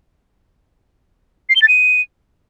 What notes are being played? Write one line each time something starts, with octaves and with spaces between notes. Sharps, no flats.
C7
G7
A6
D#7